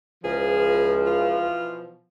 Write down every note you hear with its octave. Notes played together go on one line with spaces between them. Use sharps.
C#2 B2 E3 F3 G#4
F4